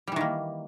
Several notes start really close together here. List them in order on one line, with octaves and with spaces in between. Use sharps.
G3 E3 D#3 A#3